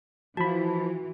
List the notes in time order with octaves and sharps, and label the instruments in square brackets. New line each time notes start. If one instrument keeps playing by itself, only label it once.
[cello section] E3 [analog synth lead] F3 [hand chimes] F#4 [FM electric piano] A5 B5